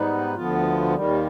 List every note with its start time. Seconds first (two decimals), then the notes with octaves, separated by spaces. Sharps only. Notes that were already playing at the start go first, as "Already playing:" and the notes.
Already playing: G#2 G3 B3 D#4 B4
0.34 D2 D3 F3 B3 F4
0.94 D#2 D#3 G3